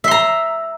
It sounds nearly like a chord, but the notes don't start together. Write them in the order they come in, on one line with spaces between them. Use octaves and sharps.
E5 C6 A#5